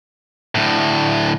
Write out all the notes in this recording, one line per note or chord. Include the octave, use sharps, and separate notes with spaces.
D2 A2